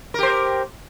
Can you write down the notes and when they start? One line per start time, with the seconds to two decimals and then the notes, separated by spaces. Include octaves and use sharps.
0.14 A#4
0.19 G4
0.23 C5